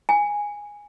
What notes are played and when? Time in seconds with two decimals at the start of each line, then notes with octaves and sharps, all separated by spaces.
0.09 G#5